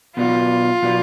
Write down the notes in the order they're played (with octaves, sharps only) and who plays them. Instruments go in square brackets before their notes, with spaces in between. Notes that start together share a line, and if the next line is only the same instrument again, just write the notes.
[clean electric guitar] B2 F#3 B3 D4 F#4 [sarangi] F4
[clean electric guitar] B2 F#3 B3 D4 F#4